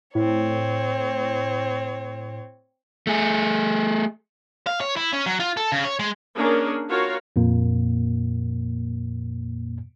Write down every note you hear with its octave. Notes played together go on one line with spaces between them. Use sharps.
A2 C4 C#5
A3 G#4
F5
C#5
E4
C#4
F#3
F4
A4
C#3
C#5
G#3
A#3 C#4 D4 G#4 A#4
F4 F#4 A#4 C#5 F5
F2 A#2 A#3